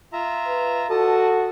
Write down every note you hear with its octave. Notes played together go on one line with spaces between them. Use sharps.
F4 E5 A#5
B4
F#4 A4 D#5 A5